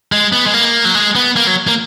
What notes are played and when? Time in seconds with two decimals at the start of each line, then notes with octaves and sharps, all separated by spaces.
0.12 G#3
0.33 B3
0.47 G#3
0.54 A#3
0.85 F#3
0.95 G#3
1.16 B3
1.36 A#3
1.47 F#3
1.67 A#3